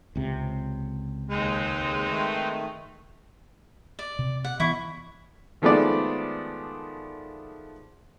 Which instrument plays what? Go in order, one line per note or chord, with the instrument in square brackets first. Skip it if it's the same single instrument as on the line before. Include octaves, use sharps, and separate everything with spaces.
[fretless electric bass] C#2 C3
[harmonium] D#2 [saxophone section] G#3 [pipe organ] C4 D#4 B4
[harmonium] D#3 A3
[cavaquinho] D5
[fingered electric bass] C3
[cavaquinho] F#5
[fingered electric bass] E3 B3 [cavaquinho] E4 C#6
[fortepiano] D#3 F3 G#3 A3 B3 D5